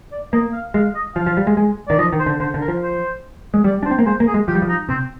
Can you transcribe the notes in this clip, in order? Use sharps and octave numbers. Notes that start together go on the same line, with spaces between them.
D5
A#3 D#5
F5
G#3 F5
D#5
F3 F5
F3
G3
G#3
G#3
D#3 D5
F3 D#5
D#3
C5
D3
D3 C5
D3
A#4
F3
C5
G#3
G3 D5
D4
C5
C4
A#3
G#3 C5
A#3
G#4
G#3
F3 G4
G3
F3
D#4
C3 C4